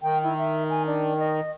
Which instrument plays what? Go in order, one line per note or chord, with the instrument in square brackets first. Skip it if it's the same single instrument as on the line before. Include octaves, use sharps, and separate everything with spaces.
[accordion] D#3 [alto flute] G5
[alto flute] E4
E5
G#5
D4
D#5